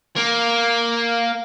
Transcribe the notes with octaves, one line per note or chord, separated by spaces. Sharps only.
A#3